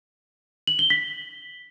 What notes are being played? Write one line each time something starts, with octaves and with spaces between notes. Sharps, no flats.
F#7
G7
B6